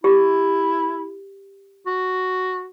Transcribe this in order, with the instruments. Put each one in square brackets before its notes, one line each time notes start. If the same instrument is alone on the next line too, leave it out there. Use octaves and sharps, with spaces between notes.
[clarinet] E4 [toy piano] G4
[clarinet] F#4